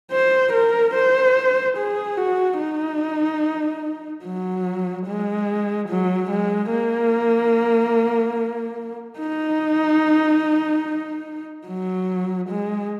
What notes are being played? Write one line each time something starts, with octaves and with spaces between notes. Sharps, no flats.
C5
A#4
C5
G#4
F#4
D#4
F#3
G#3
F#3
G#3
A#3
D#4
F#3
G#3